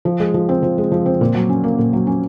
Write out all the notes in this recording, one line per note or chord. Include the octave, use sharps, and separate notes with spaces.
F3
G#3
F3
C4
F3
G#3
F3
C4
A#2
F#3
C#4
A#3
A#2
F#3
C#4